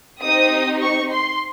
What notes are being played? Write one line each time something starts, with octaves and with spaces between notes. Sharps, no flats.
C4 D#4 G4 D#6
C#6
C6